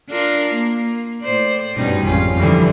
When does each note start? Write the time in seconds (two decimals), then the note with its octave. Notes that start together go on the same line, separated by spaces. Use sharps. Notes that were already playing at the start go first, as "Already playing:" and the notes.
0.10 D4 F4 A#4
0.55 A#3
1.22 A2 C5 D5
1.76 G2 B2 G3 C#4 D#4
2.05 G#1 F2 C#4 F4
2.38 G2 D3 E3 F3 G3